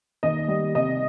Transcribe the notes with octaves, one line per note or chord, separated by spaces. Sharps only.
D#2 D#5
G3
C3 D#5